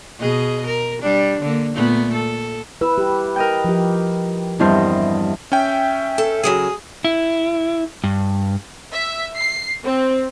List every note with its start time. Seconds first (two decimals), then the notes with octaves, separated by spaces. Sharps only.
0.20 B2 G#4 D#5
0.67 A#4
1.02 G3 D4
1.42 D3 A#3
1.75 A#2 A3 B3
2.13 A4
2.81 E4 B4 E6
2.98 G4
3.36 A#4 D#5 G5
3.64 F3 G4
4.59 E2 G2 C4 E4 C5 D#5
5.52 C#4 E5 G5
6.18 A4
6.44 C#3 F#3 G#4 G#5
7.04 E4
8.04 G2
8.92 E5
9.38 C7
9.84 C4